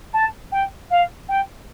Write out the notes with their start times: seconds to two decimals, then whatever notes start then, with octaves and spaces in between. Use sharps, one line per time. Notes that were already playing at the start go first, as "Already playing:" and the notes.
0.13 A5
0.52 G5
0.90 F5
1.28 G5